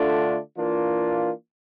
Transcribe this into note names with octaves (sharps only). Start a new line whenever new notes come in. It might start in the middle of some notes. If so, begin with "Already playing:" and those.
Already playing: D3 A3 D4 F4
E3 A#3 D4 F4